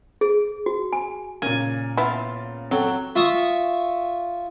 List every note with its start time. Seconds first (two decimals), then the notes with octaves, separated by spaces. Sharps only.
0.21 G#4
0.66 F#4
0.93 G#5
1.42 A#2 C#3 A#3 G#5
1.97 B3 E4 F4
2.71 F#3 C4 A4
3.16 F4 E5 C#6 D#6